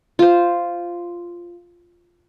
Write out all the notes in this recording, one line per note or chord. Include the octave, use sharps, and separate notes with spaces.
F4 C5